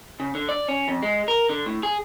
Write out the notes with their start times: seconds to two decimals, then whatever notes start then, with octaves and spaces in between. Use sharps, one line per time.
0.20 C#3
0.35 D3
0.49 D5
0.68 C#4
0.88 F2
1.03 G#3
1.28 A#4
1.49 D3
1.66 A2
1.83 G#4